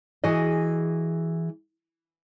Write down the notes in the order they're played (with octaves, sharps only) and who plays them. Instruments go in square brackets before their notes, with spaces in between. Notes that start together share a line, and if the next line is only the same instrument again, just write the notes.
[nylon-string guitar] E3 F#4 G#4 D#5